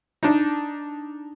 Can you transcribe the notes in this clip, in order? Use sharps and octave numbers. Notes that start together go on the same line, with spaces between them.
D4 D#4